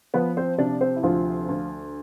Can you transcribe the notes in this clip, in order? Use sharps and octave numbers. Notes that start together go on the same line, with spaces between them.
F3 B3 B4
C4 C5
C3 D4 D5
C4 C5
E4
D2 F3 F4
D2